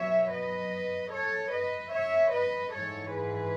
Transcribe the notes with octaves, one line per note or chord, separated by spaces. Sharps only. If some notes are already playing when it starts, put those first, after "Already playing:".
Already playing: B2 F#3 C#5 E5
B4 D#5
A4 C#5
B4 D#5
C#5 E5
B4 D#5
G#2 E3 G#3 A4 C#5
G#4 B4